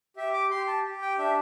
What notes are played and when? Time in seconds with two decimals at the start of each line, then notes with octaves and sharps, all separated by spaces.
0.17 G4 E5
0.34 D6
0.50 G4 C6
0.67 A5
0.84 G4
1.02 G5
1.18 D4 E5